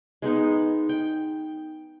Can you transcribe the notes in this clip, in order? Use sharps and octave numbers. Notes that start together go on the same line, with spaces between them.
G#3 B3 D#4
G5